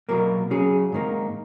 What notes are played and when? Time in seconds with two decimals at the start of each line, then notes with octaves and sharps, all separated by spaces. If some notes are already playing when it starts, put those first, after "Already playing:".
0.09 B2 F#3 A#3 A#4
0.50 C#3 F#3 C#4 G#4
0.92 G#2 D#3 A#3